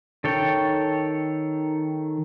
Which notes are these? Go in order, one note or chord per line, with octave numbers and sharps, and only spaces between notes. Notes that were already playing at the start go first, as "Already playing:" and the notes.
D#3 A4 C#5 G5